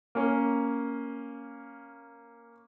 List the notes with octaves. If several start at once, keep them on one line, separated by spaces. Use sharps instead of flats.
A#3 C#4